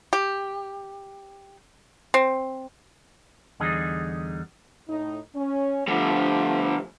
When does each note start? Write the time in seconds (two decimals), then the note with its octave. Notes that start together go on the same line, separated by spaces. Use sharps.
0.13 G4
2.14 C4
3.60 E2 D3 G3 D#4 G#4
4.89 A2 D#4
5.35 C#4
5.88 D3 F3 G3 A3